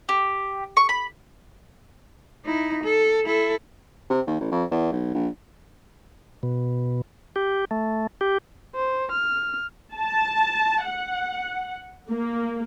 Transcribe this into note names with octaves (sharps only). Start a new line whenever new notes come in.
G4
C#6
B5
D#4 E4
A4
E4 A4
C3
D#2
A1
F2
E2
B1
A#1
B2
G4
A3
G4
C5
F6
A5
F#5
A#3